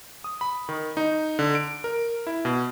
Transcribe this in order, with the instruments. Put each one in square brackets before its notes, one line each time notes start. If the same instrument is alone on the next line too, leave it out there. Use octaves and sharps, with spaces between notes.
[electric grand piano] D#6
B5
D#3
D#4
D3
D7
A#4
E4
B2